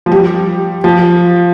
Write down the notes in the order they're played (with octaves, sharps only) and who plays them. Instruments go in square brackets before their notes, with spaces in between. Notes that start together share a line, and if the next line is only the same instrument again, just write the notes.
[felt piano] F3
G3
F3